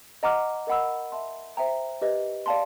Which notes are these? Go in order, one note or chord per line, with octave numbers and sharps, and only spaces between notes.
D#5 F#5 A#5 D6 F6
A#4 D#5 F#5 B5 E6
E5 A5 C6
C5 E5 G5 A#5
G4 B4 D#5
D5 F5 A5 C6